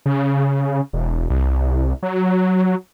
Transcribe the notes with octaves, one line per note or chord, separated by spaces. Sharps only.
C#3
E1
C2
F#3